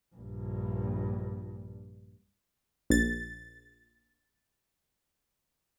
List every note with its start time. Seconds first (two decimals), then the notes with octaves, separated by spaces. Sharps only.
0.16 A#1 G2
2.90 A#1 A6